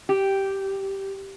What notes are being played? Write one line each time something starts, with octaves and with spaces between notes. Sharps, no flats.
G4